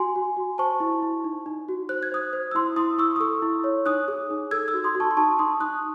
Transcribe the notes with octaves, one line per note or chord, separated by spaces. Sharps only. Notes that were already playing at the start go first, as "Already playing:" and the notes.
Already playing: F#4 G#5 C6
F#4
F#4
C5 A5 C#6
E4
E4
D#4
D#4
F#4
C5 F#6
G#6
C5 D#6 F#6
C5
E6
E4 C6 D#6
E4 C6 D#6
E4 C#6 E6
D#6
A4 C#6 E6
E4
C#5
D#4 D#6 F#6
G#4
D#4
A4 E6 G#6
E6 G#6
F#4
C6 D#6
F#4
A5 C#6
C6
D#4 A5 C#6
D#4 C6 D#6
D#4 D#6 F#6